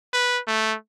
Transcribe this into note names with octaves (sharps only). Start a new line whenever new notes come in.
B4
A3